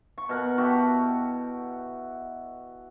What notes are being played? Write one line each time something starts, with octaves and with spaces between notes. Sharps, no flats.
C#6
B2 A#4 F#5
E4 F#4 G4 A4